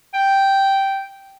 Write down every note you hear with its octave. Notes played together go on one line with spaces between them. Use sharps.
G5